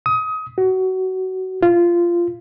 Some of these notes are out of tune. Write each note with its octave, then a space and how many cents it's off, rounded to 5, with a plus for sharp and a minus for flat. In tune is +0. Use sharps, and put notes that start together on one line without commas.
D#6 +25
F#4 +20
F4 -15